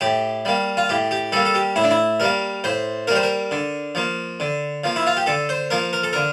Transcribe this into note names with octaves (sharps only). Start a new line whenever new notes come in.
A2 G4
G3 A#3
F4
A2 G4
G4
G3 A#3 A4
A4
G4
A2 E4
D4
E4
G3 A#3 A#4
A2 C5
G3 A#3 A#4
C5
A#4
D3
F3 A#3
D3
F3 A#3
E4
F4
G4
D3 A4
C5
F3 A#3 A#4
A#4
A4
D3 A#4